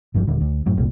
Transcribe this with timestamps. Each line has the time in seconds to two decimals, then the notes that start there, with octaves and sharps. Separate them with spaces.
0.14 G1 G2 C#3 F3
0.27 D#1 D3
0.41 D2
0.66 F#2 A2
0.77 F1 C2 A#2